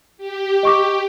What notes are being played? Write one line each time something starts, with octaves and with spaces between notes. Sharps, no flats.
G4
D#5 C#6 D6